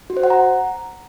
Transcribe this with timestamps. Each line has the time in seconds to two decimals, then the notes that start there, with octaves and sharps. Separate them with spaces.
0.10 F#4
0.17 C5
0.23 F#5
0.30 A#5